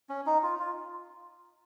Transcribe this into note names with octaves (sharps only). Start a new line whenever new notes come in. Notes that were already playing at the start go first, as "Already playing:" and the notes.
C#4
D#4
F4
F4